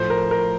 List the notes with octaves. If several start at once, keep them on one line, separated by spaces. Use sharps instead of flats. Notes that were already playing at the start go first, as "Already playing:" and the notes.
Already playing: A2 F3 C5
A#4
A#4